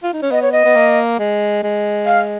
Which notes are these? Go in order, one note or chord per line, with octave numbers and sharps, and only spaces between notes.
F4
D#4
C#4
B3 D#5
C#5
D#5
B3
A#3
G#3
G#3
F5